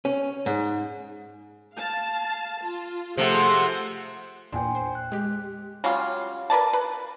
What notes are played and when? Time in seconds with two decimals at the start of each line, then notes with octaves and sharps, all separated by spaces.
0.05 C#4
0.46 G#2
1.75 F5 A5
2.61 F4
3.17 C3 F3 A3 G#4 F#5
4.52 E2 A#2 D4 G5 G#5 C6
4.75 C5
4.95 F#6
5.12 G#3 G4
5.84 F#3 G3 C#4 F4
6.50 A#4 B4 D5 A5
6.73 B4